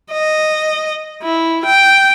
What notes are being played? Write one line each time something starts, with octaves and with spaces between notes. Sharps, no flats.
D#5
E4
G5